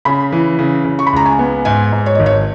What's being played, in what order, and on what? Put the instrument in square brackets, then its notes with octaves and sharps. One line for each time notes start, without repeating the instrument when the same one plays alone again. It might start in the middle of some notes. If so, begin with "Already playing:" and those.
[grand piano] C#3 [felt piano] B5
[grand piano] E3
C#3
C#3
[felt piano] C#6
B5
[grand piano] C#2 [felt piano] A#5
[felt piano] G#5
[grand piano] B3
[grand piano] G#2 [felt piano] G#5
[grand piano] G#2
[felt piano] C#5
[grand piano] G#1 [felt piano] D#5
[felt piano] C#5